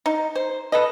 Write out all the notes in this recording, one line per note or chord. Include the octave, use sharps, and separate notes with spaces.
D#4
C5
A4 B4 D#5